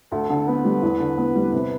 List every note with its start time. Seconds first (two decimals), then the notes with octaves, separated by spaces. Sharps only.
0.12 D2 A4
0.30 D3
0.47 B3 B4
0.64 G3
0.82 E2
1.00 D3
1.17 B3
1.35 G3
1.53 C3